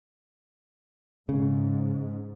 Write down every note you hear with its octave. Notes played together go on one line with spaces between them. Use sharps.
G#2 C#3